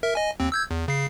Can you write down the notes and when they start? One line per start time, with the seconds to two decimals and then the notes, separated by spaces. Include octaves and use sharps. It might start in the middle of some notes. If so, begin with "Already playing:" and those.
0.03 A#4 E5
0.15 D#5 G#5
0.40 D#2 C4
0.52 E6 G6 G#6
0.71 E2
0.88 C#3 C7